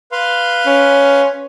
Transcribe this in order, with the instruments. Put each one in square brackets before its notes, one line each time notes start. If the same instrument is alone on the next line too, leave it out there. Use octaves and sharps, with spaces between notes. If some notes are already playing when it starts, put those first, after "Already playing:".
[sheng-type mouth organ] B4 F5 C6
[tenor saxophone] C#4